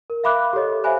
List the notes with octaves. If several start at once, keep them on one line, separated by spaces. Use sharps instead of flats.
A#4
E5 F5 B5 D6 F#6
G4 A4 C#5 D#5
C5 E5 F5 G#5 B5 F#6